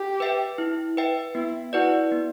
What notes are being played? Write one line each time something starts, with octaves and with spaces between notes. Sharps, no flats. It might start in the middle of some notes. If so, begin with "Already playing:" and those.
Already playing: G4
B4 E5 G5
E4
B4 E5 G5
B3 E4
E4 F#4 B4 D5
B3